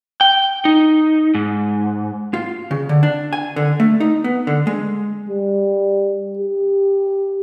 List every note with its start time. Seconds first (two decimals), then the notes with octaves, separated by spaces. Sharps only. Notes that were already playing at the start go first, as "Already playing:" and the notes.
0.21 G5
0.65 D#4
1.35 G#2
2.34 F4
2.71 C#3
2.89 D3
3.03 D4
3.33 G#5
3.56 D3
3.80 A3
4.00 D#4
4.24 B3
4.47 D3
4.67 G#3
5.29 G3
6.38 G4